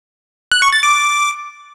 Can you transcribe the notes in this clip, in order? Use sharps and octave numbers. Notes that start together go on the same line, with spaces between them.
F#6
C#6
A6
D6